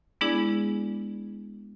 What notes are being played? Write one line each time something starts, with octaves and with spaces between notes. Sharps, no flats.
G#3 B3 D4 E4 G#4 D5